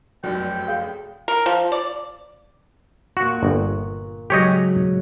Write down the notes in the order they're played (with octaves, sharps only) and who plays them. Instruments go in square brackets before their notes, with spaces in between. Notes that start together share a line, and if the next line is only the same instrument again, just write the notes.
[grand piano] F1 F#2 [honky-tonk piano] F#3 D5 G6 [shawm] G5
[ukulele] G#4 F5
[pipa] A#4
F3
D5
[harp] A#2 C#6 F#6 [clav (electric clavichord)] F#4
[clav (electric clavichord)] G1
[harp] G#2 C#3 F#3 [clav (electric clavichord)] G4 C#5 D#5